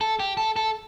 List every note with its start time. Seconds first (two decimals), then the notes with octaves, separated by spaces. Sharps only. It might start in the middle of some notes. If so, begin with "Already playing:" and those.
0.01 A4
0.20 G4
0.37 A4
0.56 A4